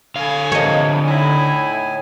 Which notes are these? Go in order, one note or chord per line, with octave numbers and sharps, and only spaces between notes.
D3 A4 F5 G#5
C3 F3 C#5 D#5
A2 D#4 E4 G#5